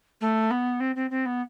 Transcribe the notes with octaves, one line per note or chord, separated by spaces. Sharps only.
A3
B3
C4
C4
C4
B3